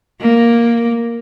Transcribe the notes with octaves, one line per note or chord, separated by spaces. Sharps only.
A#3